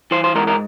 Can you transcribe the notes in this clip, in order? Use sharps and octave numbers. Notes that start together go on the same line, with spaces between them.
E3 C5
C5
G#2 A#4
A#4